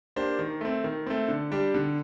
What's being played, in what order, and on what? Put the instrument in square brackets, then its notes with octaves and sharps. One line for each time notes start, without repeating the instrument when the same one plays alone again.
[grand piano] A#3 D4 G4 C5
D#3
A3 C4
D#3
A3 C4
D3
G3 D4 G4
D3